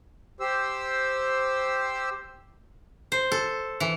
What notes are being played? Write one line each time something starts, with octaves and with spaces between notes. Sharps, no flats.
G4 C5 E6
C5
A4
E3